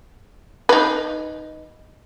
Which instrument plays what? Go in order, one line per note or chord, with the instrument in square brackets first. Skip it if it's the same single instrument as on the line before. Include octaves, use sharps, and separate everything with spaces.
[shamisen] D#4 B4